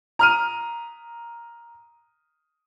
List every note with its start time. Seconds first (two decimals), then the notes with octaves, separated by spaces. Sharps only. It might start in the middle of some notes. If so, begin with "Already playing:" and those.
0.19 A#5 F6 D#7